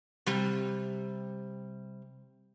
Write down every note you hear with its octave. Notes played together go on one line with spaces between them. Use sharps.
C3 G3